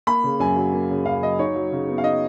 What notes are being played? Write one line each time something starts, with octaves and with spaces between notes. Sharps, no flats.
A#3 B5
C#3
F#2 G#5
F#3
A#3
C#3
F#2 F5
F#3 D#5
D#4 C#5
F#3
C#3
B3
F5
D#4 D#5